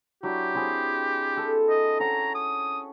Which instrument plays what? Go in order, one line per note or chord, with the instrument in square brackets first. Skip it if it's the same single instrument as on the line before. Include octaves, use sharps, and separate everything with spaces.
[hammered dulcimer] F#3 D4 E4 [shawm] G4
[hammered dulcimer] C4 E4 G#4
A4
[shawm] D#5
[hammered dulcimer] C#4 C#5 F#5 [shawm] A#5
[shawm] D#6